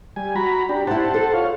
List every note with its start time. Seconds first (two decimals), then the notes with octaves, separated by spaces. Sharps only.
0.16 G3 G#5
0.35 F#4 A#5 B5
0.69 D4 G4
0.87 E4 G4 C5 F#5 A5
1.14 A4
1.34 F4 C#5 F5